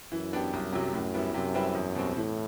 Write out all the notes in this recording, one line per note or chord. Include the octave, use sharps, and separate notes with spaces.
F#2 E3
B3 D4 G4
C2
C3 F#3
F#2 A2
G3 B3 E4
F#2 C3
G3 C4 E4 B4
E2
B2 G3 C4
A2 E3